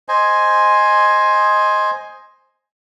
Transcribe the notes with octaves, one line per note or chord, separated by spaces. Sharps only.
C5 D#5 G#5